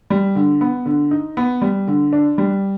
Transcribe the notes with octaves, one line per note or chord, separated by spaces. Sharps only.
G3
D3
B3
D3
D#4
B3
G3
D3
D4
G3